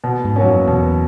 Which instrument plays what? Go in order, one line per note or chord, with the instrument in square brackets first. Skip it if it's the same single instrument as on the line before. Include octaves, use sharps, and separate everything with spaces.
[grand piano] B2
[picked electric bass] G#2
[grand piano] F#3 A#3 C#4
[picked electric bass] F#2
[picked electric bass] E2 [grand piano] B2